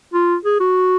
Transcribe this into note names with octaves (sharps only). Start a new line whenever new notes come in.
F4
G#4
F#4